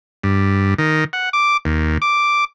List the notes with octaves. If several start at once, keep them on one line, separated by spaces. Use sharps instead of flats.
G2
D#3
F#5
D6
D#2
D6